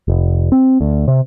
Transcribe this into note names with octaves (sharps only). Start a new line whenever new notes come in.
F1
C4
D2
C3